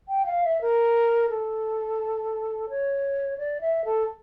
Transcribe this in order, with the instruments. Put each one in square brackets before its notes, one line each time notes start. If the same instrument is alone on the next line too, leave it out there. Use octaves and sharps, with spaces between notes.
[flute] G5
F5
E5
A#4
A4
C#5
D5
E5
A4